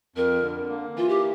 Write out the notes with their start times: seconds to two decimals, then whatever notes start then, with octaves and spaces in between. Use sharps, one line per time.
0.16 F2 A#4
0.42 D3
0.69 A#3
0.95 E3 F4
1.09 G4